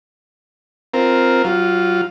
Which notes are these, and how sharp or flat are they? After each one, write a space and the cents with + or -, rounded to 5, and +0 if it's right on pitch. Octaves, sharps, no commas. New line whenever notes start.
C4 +0 F4 +0 A#4 +0
F#3 +25 F4 +0